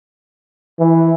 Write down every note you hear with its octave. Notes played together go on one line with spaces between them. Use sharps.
E3